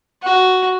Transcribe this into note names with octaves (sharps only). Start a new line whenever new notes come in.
F#4